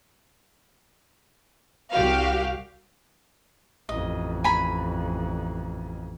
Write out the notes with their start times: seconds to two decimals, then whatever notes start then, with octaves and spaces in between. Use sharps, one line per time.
1.93 C2 F#4 G4 F5
3.89 A1 F2 D#5
4.44 G#5 A#5 B5